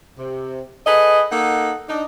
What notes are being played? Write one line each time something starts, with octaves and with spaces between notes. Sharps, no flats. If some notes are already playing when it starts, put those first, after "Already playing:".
C3
G#4 A4 B4 D#5
A#3 D#4 A4 F#5
D4 D#4